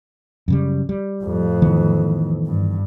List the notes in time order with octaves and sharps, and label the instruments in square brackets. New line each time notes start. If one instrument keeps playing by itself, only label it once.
[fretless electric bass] F#2 C#3 G3
G3
[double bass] F2 A2
[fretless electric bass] D#3 E3 B3
[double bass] G2